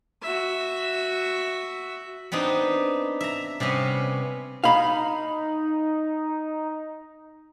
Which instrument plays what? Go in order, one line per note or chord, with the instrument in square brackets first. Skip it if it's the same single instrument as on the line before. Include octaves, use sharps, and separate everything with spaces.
[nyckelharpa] F#4 E5
[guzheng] B3 C4 D4 D#4
E5 A#5
C3 G3 B3 C#4
[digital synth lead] D#4 [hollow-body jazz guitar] F5 B5